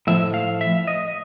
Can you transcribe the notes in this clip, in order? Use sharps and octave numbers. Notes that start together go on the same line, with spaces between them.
A2 F3 E5
F5
E5
D#5